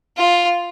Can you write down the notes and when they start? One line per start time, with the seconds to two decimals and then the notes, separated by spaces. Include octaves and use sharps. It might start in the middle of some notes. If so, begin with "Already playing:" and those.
0.17 F4